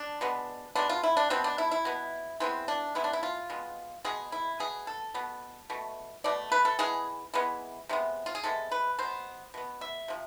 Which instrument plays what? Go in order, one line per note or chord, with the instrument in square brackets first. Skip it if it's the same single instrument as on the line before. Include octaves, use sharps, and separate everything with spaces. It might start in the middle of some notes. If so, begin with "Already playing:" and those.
Already playing: [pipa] D4
B2 G#3 B3
B2 G#3 B3 D4
F4
E4
D4
B2 B3 C4
D4
E4
E4
B2 B3
E3 G#3 B3 C4
D4
E3 G#3 B3 E4
D4
E4
F4
B2 G#3 B3
B2 G#3 B3 G#4
E4
B2 B3 G#4
A4
B2 B3
B2 A3
B2 A3 D5
B4
A4
E3 G#3 B3 G#4
E3 G#3 B3
C3 G#3 B3
F4
G#4
C3 G#3 B3 A4
B4
B2 B3 C5
B2 B3
E5
C3 F3